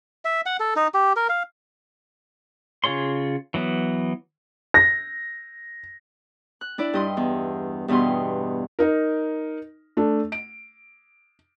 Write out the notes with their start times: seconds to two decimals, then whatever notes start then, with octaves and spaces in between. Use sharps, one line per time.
0.25 E5
0.46 F#5
0.60 A4
0.76 D#4
0.94 G4
1.16 A#4
1.29 F5
2.84 C#3 F4 G#4 C#5 C6
3.54 E3 F#3 B3
4.74 A#6
6.61 F#6
6.78 D4 E4 D5
6.94 G2 D#5 C6
7.17 E2
7.88 E2 G2 B2 D#5 C6
8.79 D#4 A#4
9.97 A3 D4
10.32 D7